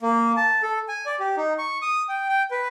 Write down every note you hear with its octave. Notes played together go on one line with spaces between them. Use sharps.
A#3
A5
A4
G#5
D5
G4
D#4
C#6
D#6
G5
G5
B4